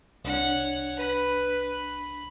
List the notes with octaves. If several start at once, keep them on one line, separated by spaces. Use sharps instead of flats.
C2 D4 C#5 F#5
B4 B5